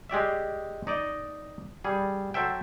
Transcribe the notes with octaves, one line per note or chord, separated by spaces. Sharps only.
G#3 G4 D5 E5
D#4 D5 D#5
G3 G#4
F#3 A4 C5 E5 G5